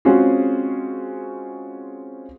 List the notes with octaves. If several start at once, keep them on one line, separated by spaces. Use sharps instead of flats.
G#3 C4 C#4 F4 F#4 G#4